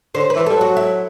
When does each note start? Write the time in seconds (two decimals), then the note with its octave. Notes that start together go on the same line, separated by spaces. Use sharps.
0.15 D3 C5
0.30 B4
0.36 E3
0.46 G3 A4
0.56 F#3 F#4
0.77 E4